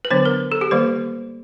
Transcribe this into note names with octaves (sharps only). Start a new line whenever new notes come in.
B4
D3 F#3 B3 D4 C5
A#4
A4
G4
D#3 G3 A#3 C5